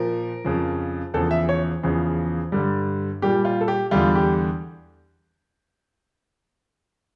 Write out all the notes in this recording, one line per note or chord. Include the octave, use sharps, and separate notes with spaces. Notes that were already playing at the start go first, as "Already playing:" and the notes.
Already playing: A#2 F3 A#4
F2 C#3 F3
E2 C#3 F3 A4
E5
C#5
E2 C#3 F3
G2 D3 G3
A#2 G3 G4
F4
A4
G4
E2 D3 G3 F4
G4